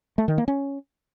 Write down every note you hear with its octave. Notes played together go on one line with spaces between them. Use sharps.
A3
D#3
A#3
C#4